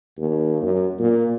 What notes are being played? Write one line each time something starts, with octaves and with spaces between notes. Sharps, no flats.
D#2
F#2
A#2